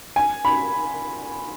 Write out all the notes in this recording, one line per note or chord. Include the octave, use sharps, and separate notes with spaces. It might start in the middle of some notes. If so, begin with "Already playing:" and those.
G#5
B5